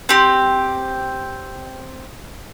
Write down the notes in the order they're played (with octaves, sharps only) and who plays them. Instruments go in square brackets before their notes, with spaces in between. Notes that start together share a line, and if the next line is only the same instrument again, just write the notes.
[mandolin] C4 G4